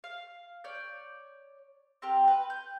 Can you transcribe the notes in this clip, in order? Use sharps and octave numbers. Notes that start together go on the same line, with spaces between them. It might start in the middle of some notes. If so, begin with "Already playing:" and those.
F5
C#5 D5 G6
C4 G4 A#4
B4
G6